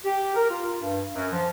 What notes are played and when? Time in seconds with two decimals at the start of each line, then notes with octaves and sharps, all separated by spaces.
0.05 G4
0.35 A#4
0.49 F4
0.79 G2
1.14 F#2
1.32 F3